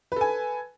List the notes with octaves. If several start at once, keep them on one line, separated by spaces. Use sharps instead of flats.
A4 B4 G#5